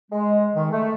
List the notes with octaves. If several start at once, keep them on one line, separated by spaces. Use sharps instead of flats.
G#3
D#3
A3